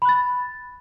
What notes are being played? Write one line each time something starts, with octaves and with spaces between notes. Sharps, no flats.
B5 F#6 A6